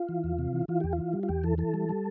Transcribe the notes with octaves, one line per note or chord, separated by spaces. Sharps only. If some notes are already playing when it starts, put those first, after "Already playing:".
Already playing: F4
E3
E2
C3
E3
E3 F4
E2 G4
F4
E3
G3
F4
E2 G4
E3 A4
E3 A4
G3
G3